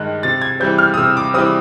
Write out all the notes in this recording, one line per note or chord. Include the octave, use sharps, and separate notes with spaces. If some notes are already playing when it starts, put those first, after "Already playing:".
Already playing: G2 D#3 G#3 F#6
C3 A6
G#6
E3 G3 C4 G6
F6
D#6
C3 E6
D6
E3 G3 C4 D#6